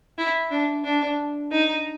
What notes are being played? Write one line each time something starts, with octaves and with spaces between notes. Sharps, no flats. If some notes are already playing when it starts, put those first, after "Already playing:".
E4
D4
D4
D#4